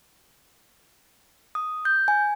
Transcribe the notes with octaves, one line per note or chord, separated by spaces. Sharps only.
D#6
G6
G#5